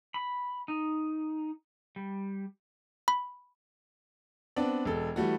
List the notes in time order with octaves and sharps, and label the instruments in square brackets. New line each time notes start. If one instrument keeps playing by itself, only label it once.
[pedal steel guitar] B5
D#4
G3
[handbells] B5
[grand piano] B3 C4 D4 D5
E1 A4
E3 G3 A3 F#4